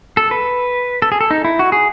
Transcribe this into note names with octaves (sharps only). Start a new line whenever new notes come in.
A4
B4
A4
G#4
A4
D#4
E4
F#4
G#4